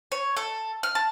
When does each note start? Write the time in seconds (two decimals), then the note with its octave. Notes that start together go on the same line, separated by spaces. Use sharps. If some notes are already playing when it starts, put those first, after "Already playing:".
0.12 C#5
0.37 A4
0.83 F6
0.95 A5